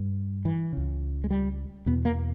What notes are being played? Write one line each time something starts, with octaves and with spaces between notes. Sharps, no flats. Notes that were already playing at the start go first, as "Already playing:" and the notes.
Already playing: G2
E3
C#2 C#3
G#3
G3
E2 B2 B3
A#3